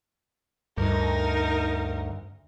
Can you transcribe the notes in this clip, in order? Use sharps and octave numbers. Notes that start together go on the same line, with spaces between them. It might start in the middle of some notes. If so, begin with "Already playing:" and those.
D2 G2 D#4 A#4